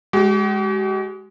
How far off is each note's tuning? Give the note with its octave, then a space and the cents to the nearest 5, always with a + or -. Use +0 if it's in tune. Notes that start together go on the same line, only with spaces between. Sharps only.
G#3 +0 G4 -45